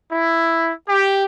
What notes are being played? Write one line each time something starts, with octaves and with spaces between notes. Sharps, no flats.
E4
G4